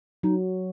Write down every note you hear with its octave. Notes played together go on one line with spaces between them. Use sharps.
F#3 D#4